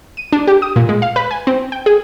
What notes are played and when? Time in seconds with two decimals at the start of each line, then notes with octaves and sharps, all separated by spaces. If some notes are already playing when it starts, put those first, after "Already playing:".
0.17 D#7
0.33 D4
0.47 G4
0.62 D#6
0.76 A#2
0.89 G#3
1.02 F5
1.16 B4
1.31 G#5
1.47 C4
1.72 G5
1.86 G#4